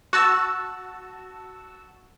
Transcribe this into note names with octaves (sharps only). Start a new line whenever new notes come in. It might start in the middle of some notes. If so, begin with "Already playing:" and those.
F#4 A5 E6